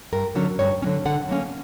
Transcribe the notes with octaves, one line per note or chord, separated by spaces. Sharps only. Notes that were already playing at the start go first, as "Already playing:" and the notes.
G2 A#4
D3 F#3 C#4
G2 C#5
D3 F#3 C#4
D3 F#5
F#3 A#3 C#4